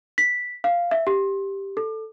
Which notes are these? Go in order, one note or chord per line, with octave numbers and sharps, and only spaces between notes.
B6
F5
E5
G4
A4